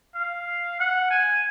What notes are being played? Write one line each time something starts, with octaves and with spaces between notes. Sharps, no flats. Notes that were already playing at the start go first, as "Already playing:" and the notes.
F5
F#5
G#5